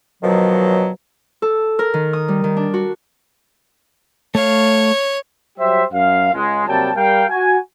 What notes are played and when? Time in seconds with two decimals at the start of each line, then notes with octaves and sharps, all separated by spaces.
0.23 B2 D#3 F3 F#3
1.42 A4
1.79 A#4
1.94 D#3
2.13 D#6
2.28 G3
2.44 D#3
2.57 D4
2.74 F#4
4.35 A3 C#5 F5
5.59 F#3 G3 G4 C5 E5
5.93 F#2 F5
6.33 C#2 G#3
6.67 C3 F#3 G3 A#3 G5 A5
6.95 G3 A#4 F5 G5
7.29 F#4 G#5